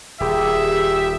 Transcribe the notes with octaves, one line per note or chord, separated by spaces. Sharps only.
D#1 G4 G#4 E5